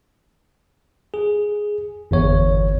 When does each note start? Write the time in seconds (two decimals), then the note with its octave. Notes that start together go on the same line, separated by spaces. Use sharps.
1.14 G#4
2.11 G1 E2 C#5